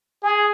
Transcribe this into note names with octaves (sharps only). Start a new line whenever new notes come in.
G#4